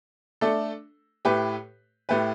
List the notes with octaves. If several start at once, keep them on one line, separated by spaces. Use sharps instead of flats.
A3 D4 A4
A2 A3 G4 B4
A2 A3 G4 B4